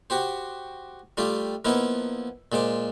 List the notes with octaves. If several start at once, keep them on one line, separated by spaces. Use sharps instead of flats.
F#4 G4 C5
G3 A3 F4 G4
F3 A#3 B3 D#4 E4
A#2 G#3 C5 D6